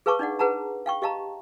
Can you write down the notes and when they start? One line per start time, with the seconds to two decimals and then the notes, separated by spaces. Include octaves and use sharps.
0.06 G#4 B4 F5 A5 C#6 D6
0.19 D4 D#4 D5 F#5
0.39 G#4 B4 F#5 A5 A#5
0.86 F5 G5 C#6
1.02 G4 D#5 F5 A5 A#5